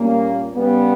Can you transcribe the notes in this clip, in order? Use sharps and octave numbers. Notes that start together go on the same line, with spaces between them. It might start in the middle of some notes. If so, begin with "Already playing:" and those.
Already playing: A#2 G3 A#3 C#4
C#3 G3 B3